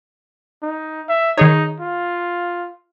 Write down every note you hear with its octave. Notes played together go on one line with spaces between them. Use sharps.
D#4
E5
D#3 D#4 G#4 C#5
F4